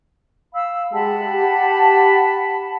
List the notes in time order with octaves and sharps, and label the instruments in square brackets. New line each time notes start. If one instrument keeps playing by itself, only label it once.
[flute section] F5 B5 E6
[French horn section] G#3 G4 [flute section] F#5 A5 B5
[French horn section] G4